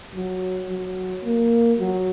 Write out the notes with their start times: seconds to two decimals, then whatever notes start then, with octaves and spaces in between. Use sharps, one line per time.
0.16 F#3
0.70 F#3
1.24 A#3
1.78 F#3